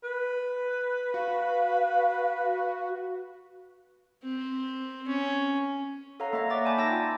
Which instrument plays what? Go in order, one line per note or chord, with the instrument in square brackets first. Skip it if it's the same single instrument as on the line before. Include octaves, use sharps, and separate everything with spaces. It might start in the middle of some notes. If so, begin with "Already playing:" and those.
[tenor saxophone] B4
[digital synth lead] F#4 [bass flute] F5
[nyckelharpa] C4
C#4
[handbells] A4 C#5 F5 F#5 A#5
A#3 D#5 E5 A#5
C#5 D5 E5 F#5 D6 A6
G#5 A5 B5 D6 G6
D#4 G5 A5 E6 A6 A#6
F4